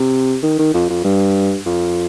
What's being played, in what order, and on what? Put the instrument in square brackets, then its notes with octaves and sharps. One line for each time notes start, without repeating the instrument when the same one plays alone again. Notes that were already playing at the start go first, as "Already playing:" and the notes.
Already playing: [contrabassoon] C3
D#3
D#3
F2
F2
G2
F2